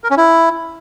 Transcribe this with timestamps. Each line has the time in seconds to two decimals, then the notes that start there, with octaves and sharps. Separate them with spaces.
0.04 A#4
0.10 C#4
0.17 E4